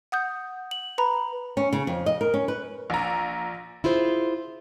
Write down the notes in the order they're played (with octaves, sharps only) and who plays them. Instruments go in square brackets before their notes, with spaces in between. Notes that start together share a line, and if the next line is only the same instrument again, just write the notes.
[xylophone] F#5 D#6 G6
F#7
B4 A#5 B5
[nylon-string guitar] C#4
C#3
F2
D#5
A#4
C#4
B4
[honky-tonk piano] A#1 A#5
[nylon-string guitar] E4 F4 G#4 C5